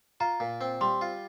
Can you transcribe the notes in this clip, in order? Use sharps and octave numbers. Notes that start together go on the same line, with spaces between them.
F4 A#5
A#2
C4
G3 C6
F4